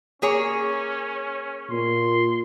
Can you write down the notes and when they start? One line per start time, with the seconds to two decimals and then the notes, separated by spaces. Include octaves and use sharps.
0.22 A#3 C#4 G#4 C#5
1.70 A#2 C6